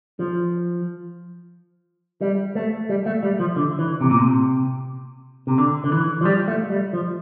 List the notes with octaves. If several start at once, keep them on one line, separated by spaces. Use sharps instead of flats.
F3
G3
A3
G3
A3
G3
F3
D3
E3
C3
A#2
C3
C3
D3
D3
E3
F3
G3
A3
G3
F3